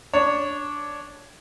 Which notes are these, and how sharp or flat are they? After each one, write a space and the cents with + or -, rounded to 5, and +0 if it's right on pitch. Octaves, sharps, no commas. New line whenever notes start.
D4 -5 C#5 +0